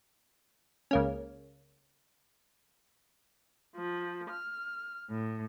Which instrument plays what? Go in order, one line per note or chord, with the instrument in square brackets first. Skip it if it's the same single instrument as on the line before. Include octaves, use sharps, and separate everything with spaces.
[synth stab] C#2 A#3 C#4
[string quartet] F3
F6
A2